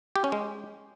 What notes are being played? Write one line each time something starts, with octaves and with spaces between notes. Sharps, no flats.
G4
C#4
G#3